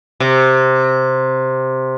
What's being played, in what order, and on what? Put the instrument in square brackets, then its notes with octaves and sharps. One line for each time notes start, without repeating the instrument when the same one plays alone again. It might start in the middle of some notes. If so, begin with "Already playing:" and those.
[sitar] C3